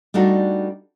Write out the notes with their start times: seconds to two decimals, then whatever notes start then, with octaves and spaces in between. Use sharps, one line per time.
0.14 G3 A3 D4 D#4 F#4